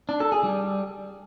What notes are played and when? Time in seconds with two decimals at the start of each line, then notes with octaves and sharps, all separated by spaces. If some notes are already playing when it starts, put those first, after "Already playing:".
0.09 D4
0.20 A4
0.32 G#4
0.44 G3